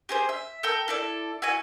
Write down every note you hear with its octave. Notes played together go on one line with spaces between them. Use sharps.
G4 G#4 C5
E5
A4 A#4 G5 E6
E4 A4 D5
E4 F#4 G#5